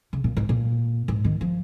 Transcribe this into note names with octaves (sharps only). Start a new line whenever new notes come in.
C#3
A#2
G#2
A#2
G#2
D#3
F3